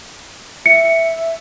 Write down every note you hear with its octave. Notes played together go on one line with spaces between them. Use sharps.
E5 C#7